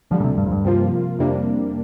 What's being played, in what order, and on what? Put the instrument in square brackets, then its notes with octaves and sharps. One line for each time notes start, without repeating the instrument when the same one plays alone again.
[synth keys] D2 D3 G3 [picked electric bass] F3
[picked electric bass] A#2
C3
G2
F2
G2
[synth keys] C3 F3 A#3 F4
F2 C3 G3 A#3 D4